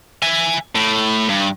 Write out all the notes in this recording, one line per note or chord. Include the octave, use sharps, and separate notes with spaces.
E5 G#5
A2
G2